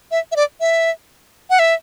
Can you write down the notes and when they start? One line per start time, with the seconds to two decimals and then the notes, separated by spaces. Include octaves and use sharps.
0.11 E5
0.32 E5
0.36 D5
0.61 E5
1.50 F#5
1.59 E5